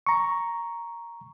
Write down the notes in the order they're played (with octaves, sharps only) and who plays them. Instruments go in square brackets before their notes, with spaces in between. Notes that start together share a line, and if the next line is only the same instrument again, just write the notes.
[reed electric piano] A#5 C#6